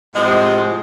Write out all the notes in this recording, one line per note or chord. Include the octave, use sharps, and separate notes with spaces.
A2 C3 F3 G#3